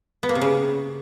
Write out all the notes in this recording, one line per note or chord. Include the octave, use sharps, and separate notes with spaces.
B3
A#3
C3
C#3